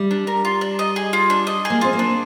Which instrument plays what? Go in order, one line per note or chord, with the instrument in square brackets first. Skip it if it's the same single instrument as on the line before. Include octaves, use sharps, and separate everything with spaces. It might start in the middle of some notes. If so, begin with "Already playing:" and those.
Already playing: [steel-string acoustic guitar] G3
[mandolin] D4
A#4
F4
D4
D#5
G#4
F4
D4
D#5
G#4
[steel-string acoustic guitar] A#3
[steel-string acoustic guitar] C4 [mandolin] F4
[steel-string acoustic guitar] A#3
[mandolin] D4